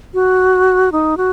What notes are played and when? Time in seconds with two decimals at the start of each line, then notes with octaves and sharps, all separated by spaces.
0.14 F#4
0.92 D#4
1.17 F#4